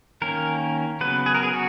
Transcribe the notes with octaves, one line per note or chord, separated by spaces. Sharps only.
D#3 A#3 C#4 A#4
C#3 F#3 B3 B4
G#4
A#4
G#4
F#4